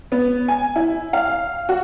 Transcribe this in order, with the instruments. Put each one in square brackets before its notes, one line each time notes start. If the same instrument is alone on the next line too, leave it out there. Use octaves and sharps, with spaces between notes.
[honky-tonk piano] B3
G#5
E4
F5
F#4